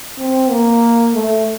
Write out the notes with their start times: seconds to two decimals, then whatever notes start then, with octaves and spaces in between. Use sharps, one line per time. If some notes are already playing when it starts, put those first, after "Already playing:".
0.18 C4
0.50 A#3
1.14 A3